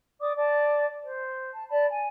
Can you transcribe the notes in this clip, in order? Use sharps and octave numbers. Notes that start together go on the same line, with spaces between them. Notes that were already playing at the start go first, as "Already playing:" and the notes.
D5 D6 D#6
D5 A5 D6
C5
A5
D5 A5 B5
G#5